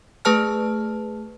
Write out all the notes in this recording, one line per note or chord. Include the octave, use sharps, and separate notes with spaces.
A3 G#4 B4 A5 F6